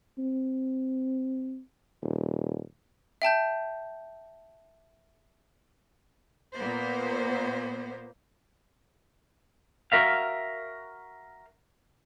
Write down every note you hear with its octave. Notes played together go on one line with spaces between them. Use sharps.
C4
D#1
E5 G5 A5 G6
A#2 A#3 B3 C5
F#4 A#4 E5 F5